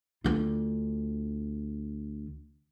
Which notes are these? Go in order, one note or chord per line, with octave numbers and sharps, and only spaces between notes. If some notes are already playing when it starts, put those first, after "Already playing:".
D2 F4